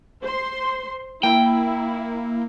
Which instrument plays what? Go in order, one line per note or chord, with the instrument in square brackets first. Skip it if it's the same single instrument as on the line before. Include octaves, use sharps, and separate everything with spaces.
[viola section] C5 C6
[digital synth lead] A#3 [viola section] E4 [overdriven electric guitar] G5